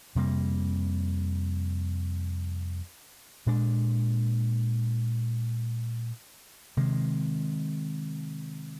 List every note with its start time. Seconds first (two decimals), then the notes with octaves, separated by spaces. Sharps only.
0.15 F2 C3 G3 A#3
3.46 A#2 G#3 D4
6.77 C3 D#3 G#3